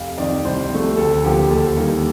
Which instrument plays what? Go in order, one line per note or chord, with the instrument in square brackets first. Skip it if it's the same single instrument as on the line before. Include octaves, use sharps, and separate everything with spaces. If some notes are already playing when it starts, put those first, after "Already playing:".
Already playing: [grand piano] F1 F5
F2 D#3 D5
C2 C5
C3 F3 A3
D2 A4
D3 F3 A#3 G4
D#2 A4
D#3 G3 A#3